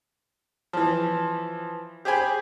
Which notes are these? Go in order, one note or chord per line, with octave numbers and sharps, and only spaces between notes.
E3 F3
G4 G#4 C5 G5 G#5 B5